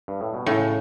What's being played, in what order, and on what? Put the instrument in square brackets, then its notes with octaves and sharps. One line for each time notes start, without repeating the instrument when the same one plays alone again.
[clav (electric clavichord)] G2
A2
B2
[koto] A2 [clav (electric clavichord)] C#3